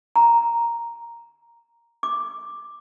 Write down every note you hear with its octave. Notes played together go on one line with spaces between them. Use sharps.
A#5
D6